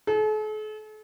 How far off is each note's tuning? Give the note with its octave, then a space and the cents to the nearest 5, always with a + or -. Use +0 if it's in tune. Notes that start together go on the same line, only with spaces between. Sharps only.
A4 -45